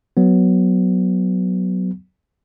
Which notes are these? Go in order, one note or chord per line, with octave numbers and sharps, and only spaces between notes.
F#3 B3